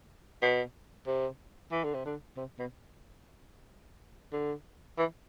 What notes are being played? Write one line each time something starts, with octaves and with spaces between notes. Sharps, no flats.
B2
C3
E3
D3
C3
D3
C3
B2
D3
E3